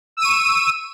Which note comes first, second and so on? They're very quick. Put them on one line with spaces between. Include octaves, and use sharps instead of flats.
E6 D#7 C#6